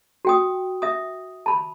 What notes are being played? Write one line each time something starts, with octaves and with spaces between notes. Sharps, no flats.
F#4 G5 D#6
E5 D#6
A5 B5